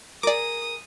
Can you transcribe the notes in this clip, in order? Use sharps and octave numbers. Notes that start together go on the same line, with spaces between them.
G#4 A#4 D5 D6 D#6